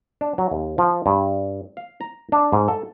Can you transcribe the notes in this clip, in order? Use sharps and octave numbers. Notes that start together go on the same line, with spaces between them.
D4
F#3
D#2
F3
G2
F5
A#5
D4
G#2
A4